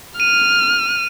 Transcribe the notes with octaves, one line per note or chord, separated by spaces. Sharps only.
F6 D#7